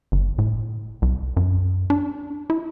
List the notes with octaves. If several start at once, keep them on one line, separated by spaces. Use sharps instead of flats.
G1
A2
C2
F#2
D4
E4